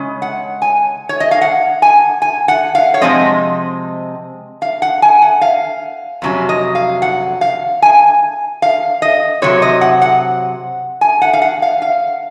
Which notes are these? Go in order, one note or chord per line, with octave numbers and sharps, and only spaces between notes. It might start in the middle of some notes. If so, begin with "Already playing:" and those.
Already playing: C#3 G#3 C#4
F#5
G#5
C#5
D#5
F5
F#5
G#5
G#5
F#5
F5
C#5
C3 F3 G#3 C4 D#5
F5
F#5
G#5
F#5
F5
F2 C3 F#3 C#4
D#5
F5
F#5
F5
G#5
F5
D#5
C3 F#3 C4 C#5
D#5
F#5
F#5
G#5
F#5
F5
F#5
F5
F5